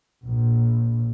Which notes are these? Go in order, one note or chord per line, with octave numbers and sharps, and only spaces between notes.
A#1